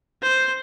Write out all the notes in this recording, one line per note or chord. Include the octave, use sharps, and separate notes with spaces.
C5